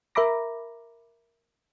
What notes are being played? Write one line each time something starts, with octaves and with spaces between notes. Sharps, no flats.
A#4 E5 A#5 B5 D6 A#6